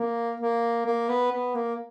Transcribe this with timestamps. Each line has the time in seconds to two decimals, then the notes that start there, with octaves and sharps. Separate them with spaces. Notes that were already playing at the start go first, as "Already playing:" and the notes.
Already playing: A#3
0.40 A#3
0.86 A#3
1.09 B3
1.32 B3
1.55 A#3